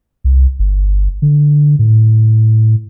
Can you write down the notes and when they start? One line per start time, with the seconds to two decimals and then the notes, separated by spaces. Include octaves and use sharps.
0.24 C2
0.59 G1
1.22 D3
1.79 A2